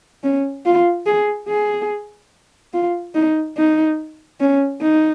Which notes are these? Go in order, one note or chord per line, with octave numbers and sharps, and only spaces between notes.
C#4
F4
G#4
G#4
F4
D#4
D#4
C#4
D#4